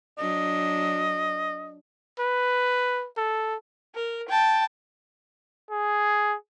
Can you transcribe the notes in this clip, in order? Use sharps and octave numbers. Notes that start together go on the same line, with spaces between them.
F#3 D4 D#5
B4
A4
A#4
G5 A5
G#4